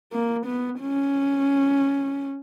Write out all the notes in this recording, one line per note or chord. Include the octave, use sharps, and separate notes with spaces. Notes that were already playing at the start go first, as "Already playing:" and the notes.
A#3
B3
C#4